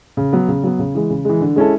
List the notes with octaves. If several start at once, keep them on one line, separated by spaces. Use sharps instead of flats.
C#3
F#3 B3
C#3
F#3 B3
C#3
E3 G#3
C#3
E3 G#3
D3
G#3 C#4 E4 A4